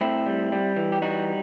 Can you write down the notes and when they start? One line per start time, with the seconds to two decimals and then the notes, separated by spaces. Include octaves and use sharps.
0.01 A2 C4 E4
0.26 G3
0.52 G3
0.76 E3
0.92 G4
1.02 G3 D#4 F#4